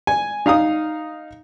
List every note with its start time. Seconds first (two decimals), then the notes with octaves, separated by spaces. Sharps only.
0.07 G#5
0.46 D#4 F5 A#5 D#6